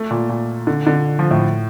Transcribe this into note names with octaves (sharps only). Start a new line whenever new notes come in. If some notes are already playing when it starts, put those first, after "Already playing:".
Already playing: A3
A#2
A#2
D3
D3
F3
A2